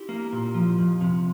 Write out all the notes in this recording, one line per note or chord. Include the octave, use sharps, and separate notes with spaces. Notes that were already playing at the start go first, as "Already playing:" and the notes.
Already playing: E4 G4
A#3
A#2
F3
F2
C3